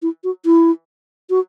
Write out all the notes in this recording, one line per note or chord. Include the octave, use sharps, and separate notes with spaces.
E4
F#4
E4
F#4